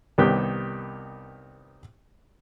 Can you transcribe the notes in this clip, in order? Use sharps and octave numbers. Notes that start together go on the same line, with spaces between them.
C2 D#3 B3 G4